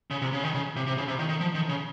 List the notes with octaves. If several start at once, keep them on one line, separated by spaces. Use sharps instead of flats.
C#3
C3
C#3
D#3
C#3
C3
C3
C#3
C3
D#3
D#3
F3
D#3
C#3